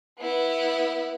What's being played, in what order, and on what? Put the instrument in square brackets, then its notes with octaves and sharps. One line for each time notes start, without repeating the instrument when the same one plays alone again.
[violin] B3 E4